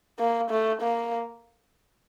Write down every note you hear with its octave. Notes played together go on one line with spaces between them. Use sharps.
A#3
A3
A#3